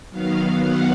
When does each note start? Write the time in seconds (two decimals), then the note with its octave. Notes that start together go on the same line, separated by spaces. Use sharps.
0.11 D#3 F#3 B3 F5
0.63 F#5